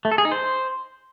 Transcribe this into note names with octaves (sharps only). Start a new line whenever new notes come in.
A3
A4
G#4
D#4
C5